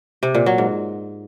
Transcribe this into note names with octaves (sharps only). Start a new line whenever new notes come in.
C3
A#2
F#3
G#2